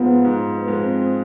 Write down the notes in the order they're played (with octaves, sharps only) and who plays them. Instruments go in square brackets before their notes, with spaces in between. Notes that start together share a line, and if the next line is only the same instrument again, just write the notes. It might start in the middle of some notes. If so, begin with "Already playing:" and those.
Already playing: [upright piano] G#2 F3 G#3 [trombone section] B3
[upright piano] G#2
[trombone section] B3
[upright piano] F3 G#3
[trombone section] C4